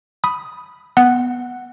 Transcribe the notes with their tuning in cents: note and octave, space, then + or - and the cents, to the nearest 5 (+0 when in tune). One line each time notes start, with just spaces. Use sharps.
B5 +0 D#6 +5
B3 +0 F#5 +0